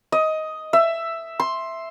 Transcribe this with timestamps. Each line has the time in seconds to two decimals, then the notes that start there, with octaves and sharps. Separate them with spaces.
0.12 D#5
0.73 E5
1.40 C6